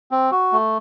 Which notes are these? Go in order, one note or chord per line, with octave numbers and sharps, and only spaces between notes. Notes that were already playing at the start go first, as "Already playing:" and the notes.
C4
F#4
A3